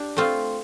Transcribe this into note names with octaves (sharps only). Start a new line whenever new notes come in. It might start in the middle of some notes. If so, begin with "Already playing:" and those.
Already playing: D4 G4
A3 C4 F4